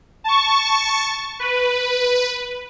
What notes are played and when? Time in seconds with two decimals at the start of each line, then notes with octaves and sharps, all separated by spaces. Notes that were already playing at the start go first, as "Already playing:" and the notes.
0.24 A5 C#6
1.39 B4